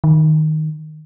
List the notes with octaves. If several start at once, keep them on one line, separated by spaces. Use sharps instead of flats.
D#3